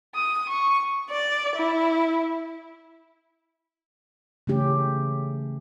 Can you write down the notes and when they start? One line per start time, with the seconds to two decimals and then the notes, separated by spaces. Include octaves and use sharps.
0.15 D#6
0.48 C#6
1.10 D5
1.56 E4
4.47 C#3 E3 A3 C#4 G4